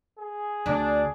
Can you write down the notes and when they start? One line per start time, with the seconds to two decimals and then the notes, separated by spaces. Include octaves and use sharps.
0.19 G#4
0.66 D2 D4